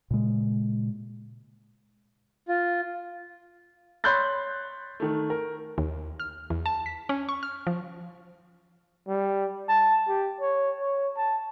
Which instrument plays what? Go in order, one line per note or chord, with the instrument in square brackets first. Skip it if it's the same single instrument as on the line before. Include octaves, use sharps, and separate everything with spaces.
[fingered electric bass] A#2 C#3 G#3
[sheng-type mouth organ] F4
[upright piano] C#5 B5 C6 F#6 G6 A6
D#3 A3
A#4
[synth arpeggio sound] D#2
F6
E2
A5
B6
C#4
C#6
F6
F3
[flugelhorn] G3
A5
G4
C#5
C#5
A5